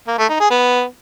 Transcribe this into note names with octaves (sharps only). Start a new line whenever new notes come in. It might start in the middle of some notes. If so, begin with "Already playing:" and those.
A#3
A3
D#4
G#4
B3